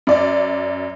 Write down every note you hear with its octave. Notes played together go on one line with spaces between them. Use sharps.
F#2 D5